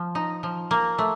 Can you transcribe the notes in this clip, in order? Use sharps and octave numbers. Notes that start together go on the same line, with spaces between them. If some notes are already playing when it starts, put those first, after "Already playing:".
Already playing: F3
D#4
F3
A#3
A3